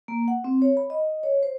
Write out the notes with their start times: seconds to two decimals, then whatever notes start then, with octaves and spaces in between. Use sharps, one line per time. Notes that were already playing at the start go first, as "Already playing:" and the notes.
0.08 A#3
0.28 F#5
0.44 C4
0.62 C#5
0.77 B5
0.90 D#5
1.23 C#5
1.43 C5